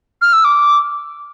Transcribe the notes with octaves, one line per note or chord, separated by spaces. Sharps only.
F6
E6
D6